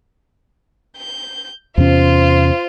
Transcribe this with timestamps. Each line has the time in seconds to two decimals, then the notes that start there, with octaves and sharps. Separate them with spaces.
0.97 G6
1.78 E2 C3 C#4 F4 C5